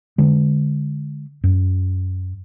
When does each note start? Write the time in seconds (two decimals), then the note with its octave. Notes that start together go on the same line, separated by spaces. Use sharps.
0.18 D3 G#3
1.44 F#2